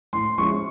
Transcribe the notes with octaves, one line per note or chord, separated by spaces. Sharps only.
A2 C6
F3 G#3 C#4 E4 C#6